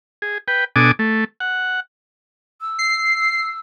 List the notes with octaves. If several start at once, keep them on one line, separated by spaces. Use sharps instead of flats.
G#4
B4 G5
B2 D4 A4 G#5 D6 D#6
A3
F#5
E6
C7